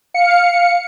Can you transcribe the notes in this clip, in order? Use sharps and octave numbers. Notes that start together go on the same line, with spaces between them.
F5 C#7